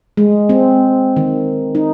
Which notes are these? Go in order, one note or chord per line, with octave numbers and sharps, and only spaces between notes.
G#3
C4
D#3
D#4